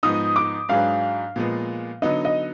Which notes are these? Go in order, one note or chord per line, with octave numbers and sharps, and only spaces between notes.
G#2 F3 B3 D#4 D#6
D6
G#2 F#3 D4 G#4 B4 F5
A#2 F3 G#3 B3
D3 F#3 B3 D#4 D#5
D#5